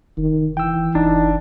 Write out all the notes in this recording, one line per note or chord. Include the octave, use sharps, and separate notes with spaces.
F1 D#3
E3 G5 E6
F#1 D4 D#4